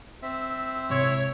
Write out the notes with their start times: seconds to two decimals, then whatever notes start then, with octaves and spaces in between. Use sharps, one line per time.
0.23 C4 E5
0.90 G#2 C3 E4 C#5